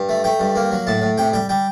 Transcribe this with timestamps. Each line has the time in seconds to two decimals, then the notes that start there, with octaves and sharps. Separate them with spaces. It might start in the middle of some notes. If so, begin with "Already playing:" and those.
Already playing: G2
0.09 A3
0.24 A3 G5
0.40 G2
0.56 A#3
0.72 F#3
0.87 A2 A5
1.02 A2
1.18 C3 G5
1.33 G3 G5
1.49 G3 G5